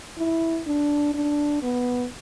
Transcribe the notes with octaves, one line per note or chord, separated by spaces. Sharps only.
E4
D4
D4
B3